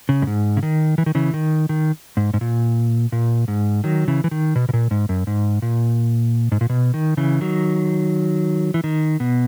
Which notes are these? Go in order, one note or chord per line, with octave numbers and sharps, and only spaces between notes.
C#3
F#2
G#2
C#3
D#3
E3
D#3
C#3 E3
D#3
D#3
G#2
G#2
A#2
A#2
G#2
D#3 F#3
C#3 E3
E3
D#3
B2
B2
A#2
G#2
F#2
G#2
A#2
G#2
A#2
B2
D#3
C#3 E3
D#3 F#3
E3
D#3
B2